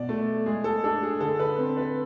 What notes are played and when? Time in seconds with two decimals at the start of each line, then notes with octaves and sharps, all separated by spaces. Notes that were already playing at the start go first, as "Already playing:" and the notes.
Already playing: B2 D5
0.09 A3
0.46 G#3 G#4
0.64 A4
0.84 D4 A4
1.03 G#4
1.20 D3 A4
1.39 B4
1.58 C4
1.77 B4